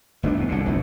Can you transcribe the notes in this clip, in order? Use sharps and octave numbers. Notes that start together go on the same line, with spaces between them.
G1 A3 C#4 D4
E2 B2
C2 F#2 D3
F1 A#1 D#2 A3